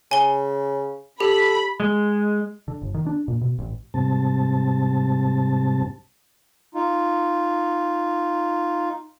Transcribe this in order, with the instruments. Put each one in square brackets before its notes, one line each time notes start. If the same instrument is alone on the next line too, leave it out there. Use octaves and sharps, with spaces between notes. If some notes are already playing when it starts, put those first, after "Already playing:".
[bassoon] C#3 [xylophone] G#5 G7
[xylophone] G4 [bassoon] A4 [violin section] B5
[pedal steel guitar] G#3
[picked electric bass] D3
G1
D#3
D4
A#2
B2
A1
[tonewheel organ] G#2 C3 G3 C4 A5
[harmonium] D#4 F4